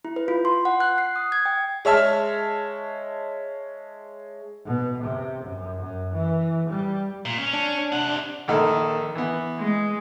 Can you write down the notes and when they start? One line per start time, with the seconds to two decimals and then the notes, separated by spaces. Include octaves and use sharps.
0.05 E4
0.16 B4
0.28 F4
0.45 C6
0.65 F#5
0.80 F#6
0.98 C7
1.16 D#6
1.32 G#6
1.45 G5
1.85 G#3 C#5 E5 A5 F6
4.65 B2
5.04 C3
5.44 F#2
5.79 F#2
6.14 E3
6.70 G3
7.25 A#2
7.38 C#4
7.53 D4
7.92 C3 F#5
8.48 A#1 D#3 A4
9.15 E3 B3
9.59 G#3